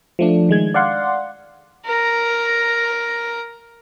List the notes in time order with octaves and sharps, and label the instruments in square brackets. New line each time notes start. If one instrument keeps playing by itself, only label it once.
[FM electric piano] F3 A3 D4
D#3 G#3 G#6
D5 F5 F#5 C6
[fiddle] A#4 A#5